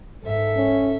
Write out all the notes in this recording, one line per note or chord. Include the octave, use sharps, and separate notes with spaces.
G#2 A4 E5
C#4